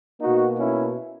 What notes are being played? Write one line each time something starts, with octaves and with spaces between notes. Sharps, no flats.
B2 A#3 D#4 F#4
C#4 E4